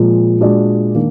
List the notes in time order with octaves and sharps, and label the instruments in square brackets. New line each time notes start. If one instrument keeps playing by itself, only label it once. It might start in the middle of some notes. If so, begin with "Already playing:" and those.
Already playing: [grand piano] A#2 F3 G#3
A#2 G#3 D4 F#4 D5
D#3 A#3 D4